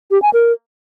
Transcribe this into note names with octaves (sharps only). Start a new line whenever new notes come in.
G4
G#5
A#4